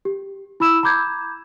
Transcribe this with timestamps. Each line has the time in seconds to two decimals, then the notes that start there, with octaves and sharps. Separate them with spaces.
0.05 G4
0.60 E4 B5 E6 E7
0.83 A#5 B5 D6 G6 G#6